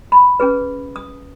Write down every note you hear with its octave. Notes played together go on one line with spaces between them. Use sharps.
B5
C#4 G#4 B4
D#6